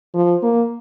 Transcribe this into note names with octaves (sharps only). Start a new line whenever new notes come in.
F3
A#3